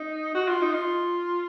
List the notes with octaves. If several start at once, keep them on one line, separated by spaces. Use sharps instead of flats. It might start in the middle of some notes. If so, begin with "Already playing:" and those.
Already playing: D#4
F#4
F4
D#4
F4